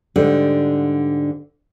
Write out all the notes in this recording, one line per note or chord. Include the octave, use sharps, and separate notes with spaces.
G#2 D3 G3